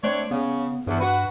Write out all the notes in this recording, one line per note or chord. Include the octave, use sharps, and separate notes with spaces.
A3 C4 D4 C#5
C#3 B3
E2 G2
F#4 B4